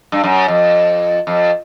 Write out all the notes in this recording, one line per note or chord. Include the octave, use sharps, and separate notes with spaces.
G2
F#2
F2
F2